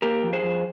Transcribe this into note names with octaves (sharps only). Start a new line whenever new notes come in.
A#3 G4 A#4
F2
G#4 C5
F2